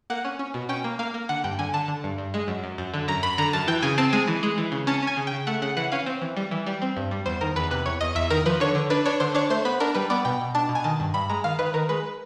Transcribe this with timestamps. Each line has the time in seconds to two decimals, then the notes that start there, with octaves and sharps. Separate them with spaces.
0.10 A#3 F#5
0.25 C#4
0.39 C#4
0.54 B2
0.69 C#4 G5
0.84 A#3
0.99 A#3 F5
1.14 A#3
1.29 D3 F#5
1.44 G2 G5
1.59 D3 G#5
1.74 D3 A5
1.88 D3
2.04 G2
2.18 G2
2.34 G#3
2.48 F#2
2.64 F#2
2.78 F#2
2.94 D3
3.08 F#2 A#5
3.23 F#2 B5
3.38 D3 A#5
3.53 F#2 A5
3.68 E3 G5
3.82 C#3 G#5
3.98 C4 A5
4.13 G#3 G#5
4.28 E3
4.43 G#3
4.58 E3
4.72 C#3
4.87 C#4 A5
5.02 C#4 G#5
5.17 C#3
5.27 C#3 G5
5.47 A3 F#5
5.62 C#3 F#5
5.77 E3 F#5
5.92 C#4 F5
6.06 C4
6.22 E3
6.37 G3
6.51 E3
6.67 G3
6.82 C4
6.97 G2
7.11 G3
7.26 E2 C5
7.41 D#3 A#4
7.56 E2 B4
7.71 C3 B4
7.86 E2 C#5
8.01 E2 D#5
8.15 E2 E5
8.30 D#3 A#4
8.46 F3 B4
8.60 D3 C#5
8.75 D3
8.90 D4 B4
9.06 D4 C#5
9.20 D3 C5
9.35 D4 C#5
9.50 A3 C5
9.65 B3 B4
9.80 D4 A#4
9.95 G3 B4
10.10 B3 D5
10.25 B2 G5
10.40 B2
10.55 D4 A5
10.69 B2
10.75 G#5
10.84 D#3 A5
11.00 G2
11.14 G2 B5
11.30 G#3 A#5
11.44 D#3 F5
11.59 D#3 B4
11.74 D#3 A#4
11.89 G#3 B4